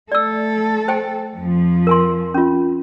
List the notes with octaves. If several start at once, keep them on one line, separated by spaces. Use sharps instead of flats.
A3 A4 D5 E6
C5 G5 G#5
F2 F3
A#4 G#5 C6
C#4 F4